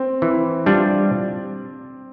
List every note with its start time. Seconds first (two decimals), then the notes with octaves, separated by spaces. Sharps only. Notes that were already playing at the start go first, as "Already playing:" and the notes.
Already playing: C4
0.22 E3
0.66 G3 D4 F4